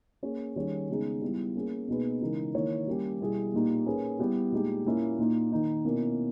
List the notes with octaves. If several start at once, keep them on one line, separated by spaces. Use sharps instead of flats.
A#3 C#4 G#4 C#5
D#3 G3 C#4 G#4 C#5
C#3 G#3 B3 D#4 G#4
G3 B3 E4
A#3 C#4 G#4
B2 A#3 D#4 G#4 B4
C#3 E3 G#3 D#4 A#4
D#3 A#3 E4 A#4 C#5
G3 A#3 C#4 G4
B2 G3 B3 E4 G#4
A#2 A#3 D#4 G4
A#3 C#4 G#4 B4
G3 B3 E4 G4
A#2 G#3 D#4 G4
A#2 A#3 C#4 E4
A#2 A#3 D#4
D#3 A#3 D#4
B2 A#3 C#4 E4 A#4